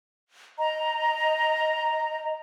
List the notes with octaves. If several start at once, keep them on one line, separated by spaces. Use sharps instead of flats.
D#5 A#5